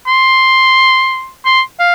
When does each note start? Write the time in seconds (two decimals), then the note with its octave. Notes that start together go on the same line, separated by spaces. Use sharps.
0.07 C6
1.45 C6
1.80 F5